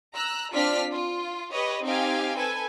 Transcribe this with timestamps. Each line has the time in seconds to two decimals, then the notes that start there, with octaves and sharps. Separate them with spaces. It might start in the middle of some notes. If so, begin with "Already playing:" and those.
0.14 A#5 E6 F#6
0.53 C4 D4 F4 F6 B6
0.91 F4
1.51 G4 B4 C#5 D#5
1.83 C4 D#4 G4 F5 G5 G#5
2.37 A4 B4 G#5